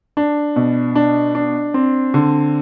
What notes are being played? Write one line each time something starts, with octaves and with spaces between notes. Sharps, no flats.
D4
B2
D4
D4
C4
D3